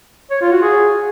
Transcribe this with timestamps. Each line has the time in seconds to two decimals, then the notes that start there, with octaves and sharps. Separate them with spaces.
0.31 C#5
0.42 F4
0.52 F#4
0.63 G#4